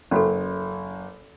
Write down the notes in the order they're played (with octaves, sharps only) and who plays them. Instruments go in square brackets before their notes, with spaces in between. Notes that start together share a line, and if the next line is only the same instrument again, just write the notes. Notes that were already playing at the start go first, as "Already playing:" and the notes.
[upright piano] F#1 [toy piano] C#4 F#4 A4